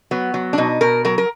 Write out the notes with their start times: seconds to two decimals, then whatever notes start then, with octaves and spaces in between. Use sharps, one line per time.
0.11 F#3 B3
0.34 F#3
0.53 D4
0.58 B2 D#4
0.81 B2 A#4
1.05 F#3 A#4
1.18 A#4